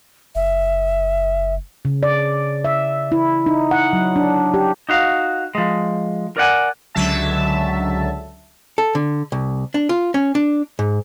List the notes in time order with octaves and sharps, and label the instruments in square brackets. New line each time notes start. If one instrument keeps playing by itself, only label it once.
[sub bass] F#1 [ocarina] E5
[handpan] C#3
D5
E5
E4
D#4
F#5
F#3
D4
G4
[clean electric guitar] D#4 F#4 F5
F3 G#3
A#4 D5 F#5 G#5
[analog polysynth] C#2 D3 F#3 E5 A5
[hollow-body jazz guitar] A4
D3
C2
D4
F4
C#4
D4
G#2